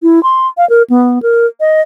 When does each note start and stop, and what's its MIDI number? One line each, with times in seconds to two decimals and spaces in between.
0.03 0.23 64
0.23 0.47 84
0.57 0.68 77
0.70 0.82 70
0.90 1.22 59
1.22 1.46 70
1.60 1.81 75